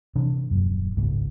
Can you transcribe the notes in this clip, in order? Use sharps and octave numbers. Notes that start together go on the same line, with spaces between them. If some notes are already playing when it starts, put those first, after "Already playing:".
C3 E3 D4
D#1 F#2
G1 C#2 G#2